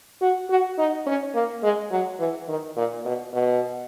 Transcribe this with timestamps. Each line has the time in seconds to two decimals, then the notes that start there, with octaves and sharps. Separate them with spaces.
0.22 F#4
0.50 F#4
0.78 D#4
1.07 C#4
1.35 A#3
1.63 G#3
1.91 F#3
2.19 E3
2.48 D#3
2.76 A#2
3.05 B2
3.33 B2